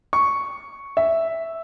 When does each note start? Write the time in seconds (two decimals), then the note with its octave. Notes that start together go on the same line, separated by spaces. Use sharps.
0.13 C#6
0.97 E5